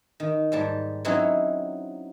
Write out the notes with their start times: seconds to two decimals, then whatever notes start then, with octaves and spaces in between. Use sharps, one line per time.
0.20 D#3
0.52 G#2 G3 A5
1.05 F#3 C4 C#4 D#4 E4